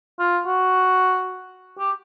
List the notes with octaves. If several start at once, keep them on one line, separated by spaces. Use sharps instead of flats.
F4
F#4
G4